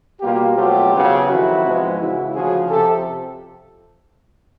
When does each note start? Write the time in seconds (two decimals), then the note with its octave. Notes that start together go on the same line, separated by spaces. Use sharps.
0.21 B2 G3 A#3 F4 G4
0.56 B2 F#3 A3 C4 F4 G4
0.92 E2 C#3 F#3 B3
1.27 F2 C3 D#3 F#3 E4 F#4
1.63 G#2 F3 G#3 B3
1.99 C#2 C#3 E3 E4 F#4
2.34 D2 C#3 F3 F#4 G#4
2.70 F2 C3 F3 G4 A4